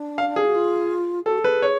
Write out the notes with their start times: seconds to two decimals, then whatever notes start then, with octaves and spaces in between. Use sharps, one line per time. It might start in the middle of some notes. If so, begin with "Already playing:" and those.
Already playing: D4
0.18 F5
0.36 G#4
0.44 F#4
0.54 F4
1.26 F#4 A4
1.38 A4
1.44 G#4 B4
1.62 C#5